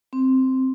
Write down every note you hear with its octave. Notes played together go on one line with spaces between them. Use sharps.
C4